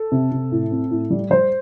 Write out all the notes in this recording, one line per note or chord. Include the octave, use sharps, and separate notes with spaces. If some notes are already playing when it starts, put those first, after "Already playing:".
Already playing: A4
C3
C3
A2
C4
A2
G3
G3 C5